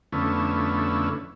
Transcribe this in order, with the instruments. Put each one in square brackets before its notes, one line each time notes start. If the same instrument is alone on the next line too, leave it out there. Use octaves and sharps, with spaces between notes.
[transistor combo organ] F2 D3 A3 B3 C#4 E4